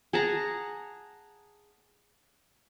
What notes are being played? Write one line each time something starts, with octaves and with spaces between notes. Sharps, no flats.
G#4 F#5 A5 A#5